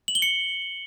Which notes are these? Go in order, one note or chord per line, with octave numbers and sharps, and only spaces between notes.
F#7
G7
C#7